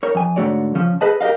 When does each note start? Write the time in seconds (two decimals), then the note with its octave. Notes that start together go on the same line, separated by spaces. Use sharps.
0.03 A#4 C#5
0.15 F2 G#5
0.36 G#2 D3 A3 F#4 C#5 D5
0.75 C#3 F3 C#4
1.01 G#4 A4 B4 D#5 A5
1.21 G4 A#4 B4 D#5 F5